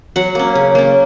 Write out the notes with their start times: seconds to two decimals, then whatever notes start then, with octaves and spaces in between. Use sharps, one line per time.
0.16 F#3 F#5
0.35 A#3 C#4
0.55 C#3
0.75 A#3 C#4